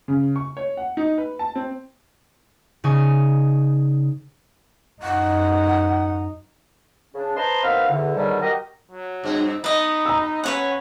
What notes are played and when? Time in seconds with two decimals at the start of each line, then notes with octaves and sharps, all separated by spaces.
0.08 C#3
0.36 C#6
0.57 C#5
0.77 F#5
0.97 D#4
1.18 B4
1.39 A5
1.55 C4
2.84 C#3 D#4 G#5 C#6
5.02 F#2 D#4 F#5
7.14 C#3 D4
7.37 B4 C5 D#5 A5 A#5 C6
7.64 D#2 B3 C4 B4 F5
7.89 E2 D3
8.15 G#2 B2 D3 D#3 F#3 G3
8.41 F#4 G4 A#4 B4 D#5
8.91 F#3
9.24 G2 C4
9.64 B3 D#4 B4 D#5
10.06 A#5 E6
10.44 C#4 B4 C#5 F#5